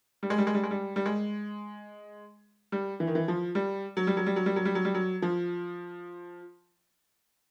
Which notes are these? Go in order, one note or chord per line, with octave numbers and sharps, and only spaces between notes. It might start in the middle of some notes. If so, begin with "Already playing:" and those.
G3
G#3
G3
G#3
G3
G#3
G3
G3
G#3
G3
E3
D#3
E3
F3
G3
F#3
G3
F#3
G3
F#3
G3
F#3
G3
F#3
G3
F#3
F3